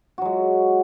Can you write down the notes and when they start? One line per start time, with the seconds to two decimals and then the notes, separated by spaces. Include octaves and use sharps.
0.18 F#4
0.22 F#3
0.25 G#3